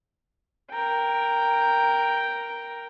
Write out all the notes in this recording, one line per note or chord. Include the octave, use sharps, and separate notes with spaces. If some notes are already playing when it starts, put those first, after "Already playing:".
A#4 G5